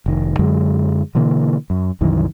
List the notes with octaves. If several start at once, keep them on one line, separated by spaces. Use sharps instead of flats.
F1 D#3
F#2 D3 F#3 G#3
B2 D3 E3 A#3
F#2
C2 F#2 D#3 E3